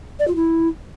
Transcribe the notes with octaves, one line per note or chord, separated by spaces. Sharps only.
D5
F4
E4